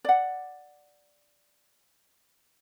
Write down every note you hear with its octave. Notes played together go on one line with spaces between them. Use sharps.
D5 F#5